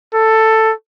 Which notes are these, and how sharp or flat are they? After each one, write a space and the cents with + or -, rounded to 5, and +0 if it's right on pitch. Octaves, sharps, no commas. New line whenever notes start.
A4 +10